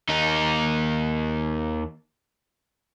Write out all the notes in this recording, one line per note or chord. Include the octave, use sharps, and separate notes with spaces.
D#2 D#4